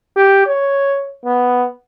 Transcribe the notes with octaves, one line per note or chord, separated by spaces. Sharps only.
G4
C#5
B3